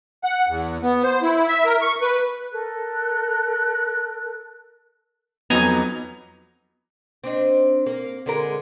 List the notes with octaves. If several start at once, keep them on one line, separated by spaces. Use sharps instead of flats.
F#5
E2
B3
C5
E4
E5
A#4
C#6
B4
A4 A#4 F#6
F2 F#3 B3 D#4 G#5 A#5
C4 D4 D#4
A#3
D3 G#3 A#4